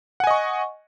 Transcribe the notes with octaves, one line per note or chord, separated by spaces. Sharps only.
D#5 F#5 G#5 C#6